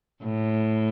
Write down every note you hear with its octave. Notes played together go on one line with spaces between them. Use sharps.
A2